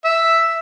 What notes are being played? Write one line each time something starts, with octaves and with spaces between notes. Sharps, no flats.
E5